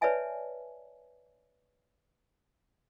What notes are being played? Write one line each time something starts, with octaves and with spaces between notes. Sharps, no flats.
B4 C#5 D5 E5 G#5 A5